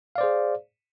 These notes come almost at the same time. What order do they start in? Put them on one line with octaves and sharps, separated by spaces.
F5 D5 C5 G#4